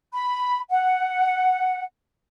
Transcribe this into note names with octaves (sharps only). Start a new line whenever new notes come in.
B5
F#5